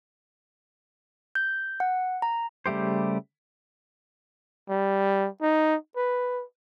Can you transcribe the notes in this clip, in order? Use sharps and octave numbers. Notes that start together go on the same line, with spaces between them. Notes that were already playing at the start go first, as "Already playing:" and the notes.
G6
F#5
A#5
C#3 G3 A3 G4 C5
G3
D#4
B4